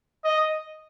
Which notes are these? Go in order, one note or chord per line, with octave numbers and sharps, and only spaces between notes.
D#5